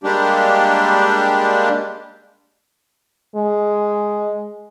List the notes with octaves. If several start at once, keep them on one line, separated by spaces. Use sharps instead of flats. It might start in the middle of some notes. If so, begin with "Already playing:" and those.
G3 G#3 A#3 D4 G4
G#3